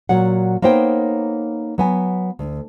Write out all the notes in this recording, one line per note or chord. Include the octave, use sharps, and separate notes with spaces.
A#2 F#3 C#5 F#5
A#3 B3 D#4 C5 C#5 G5
F#3 B3 G#5
D2